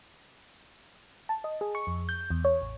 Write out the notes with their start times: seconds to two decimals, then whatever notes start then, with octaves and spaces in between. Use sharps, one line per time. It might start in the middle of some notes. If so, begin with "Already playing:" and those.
1.29 A5
1.44 D#5
1.61 G#4
1.75 C#6
1.87 F2
2.09 G6
2.30 E2
2.45 C#5
2.62 A1